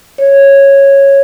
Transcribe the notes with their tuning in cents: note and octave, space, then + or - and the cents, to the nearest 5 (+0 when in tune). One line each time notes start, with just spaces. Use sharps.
C#5 -10